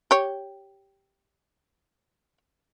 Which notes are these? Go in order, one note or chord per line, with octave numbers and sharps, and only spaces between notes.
G4 C#5